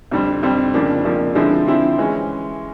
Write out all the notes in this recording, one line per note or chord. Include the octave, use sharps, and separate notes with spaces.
F2 D3 G3 C4
F2 D3 G3 C4
F2 C#3 F3 A#3 D4
F2 C#3 F3 A#3 D4
D3 F3 G#3 C4 E4
D3 F3 G#3 C4 E4
E3 G#3 C#4